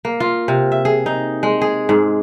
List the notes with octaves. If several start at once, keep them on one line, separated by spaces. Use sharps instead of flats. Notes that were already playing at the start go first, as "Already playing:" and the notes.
A#3
F4
C3
E5
G#4
D#4
G#3
G#4
G#2